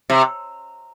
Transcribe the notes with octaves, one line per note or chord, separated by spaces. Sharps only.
C3